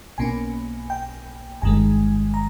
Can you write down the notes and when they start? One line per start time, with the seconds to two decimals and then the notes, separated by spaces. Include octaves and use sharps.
0.18 B1 B2 A#3 C#4 G#5
0.90 G5
1.62 G1 G2 D#3 G#3 G#5
2.34 A#5